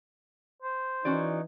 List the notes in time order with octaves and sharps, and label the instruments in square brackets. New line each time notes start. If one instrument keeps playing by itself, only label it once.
[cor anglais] C5
[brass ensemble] E3 D#4 [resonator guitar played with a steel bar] C#4 F#4 D5